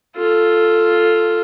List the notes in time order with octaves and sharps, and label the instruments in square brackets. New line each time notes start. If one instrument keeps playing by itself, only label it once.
[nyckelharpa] F4 A4